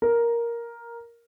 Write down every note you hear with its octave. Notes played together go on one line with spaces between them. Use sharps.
A#4